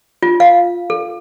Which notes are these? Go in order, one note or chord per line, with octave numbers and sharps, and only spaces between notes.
F4
F5
A4